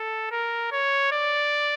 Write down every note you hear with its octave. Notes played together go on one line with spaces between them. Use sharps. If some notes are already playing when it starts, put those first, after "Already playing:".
Already playing: A4
A#4
C#5
D5